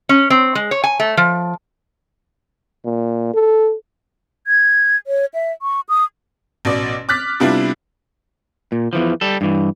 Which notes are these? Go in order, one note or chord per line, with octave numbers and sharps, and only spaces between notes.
C#4
C4
G#3
C#5
G#5
A3
F3
A#2
A4
G#6
C#5
E5
C#6
D#6
A1 B2 D5
D6 F6 F#6 A6 B6
C3 G3 B3 D4 E4 F4
A#2
E2 E3 F3
G3 A4
G2 E3